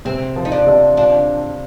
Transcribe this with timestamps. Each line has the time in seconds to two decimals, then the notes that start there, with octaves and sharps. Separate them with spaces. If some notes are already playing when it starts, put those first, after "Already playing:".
0.05 C3 C4
0.36 F3
0.45 D#4
0.52 D4
0.67 C3
0.97 D4 F4